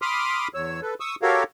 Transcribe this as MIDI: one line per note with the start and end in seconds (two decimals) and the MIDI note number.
0.02 0.48 83
0.02 0.48 84
0.02 0.48 86
0.02 0.48 87
0.02 0.48 89
0.54 0.80 40
0.54 0.80 73
0.54 0.80 88
0.82 0.94 69
0.82 0.94 71
1.00 1.15 85
1.00 1.15 87
1.00 1.15 88
1.22 1.43 66
1.22 1.43 67
1.22 1.43 69
1.22 1.43 70
1.22 1.43 73
1.22 1.43 77